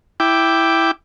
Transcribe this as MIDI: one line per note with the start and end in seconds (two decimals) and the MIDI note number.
0.20 0.91 64
0.20 0.91 79
0.20 0.91 86